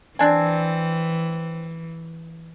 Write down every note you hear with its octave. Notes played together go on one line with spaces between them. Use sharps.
E3 C4 D4 G#5